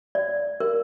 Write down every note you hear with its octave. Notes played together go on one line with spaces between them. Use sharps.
D5
A#4